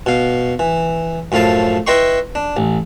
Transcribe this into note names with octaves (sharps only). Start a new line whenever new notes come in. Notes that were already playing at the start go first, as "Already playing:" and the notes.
B2 F5
E3
F#2 A2 F3 F5 A5
E4 B4 D#5 G5 C6 C#6
D4
A1